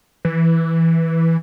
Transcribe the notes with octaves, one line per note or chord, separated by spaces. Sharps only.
E3